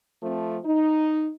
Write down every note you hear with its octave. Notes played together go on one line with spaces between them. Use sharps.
F3 A3 C4
D#4